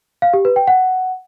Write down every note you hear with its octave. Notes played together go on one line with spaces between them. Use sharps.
F5
G4
B4
G5
F#5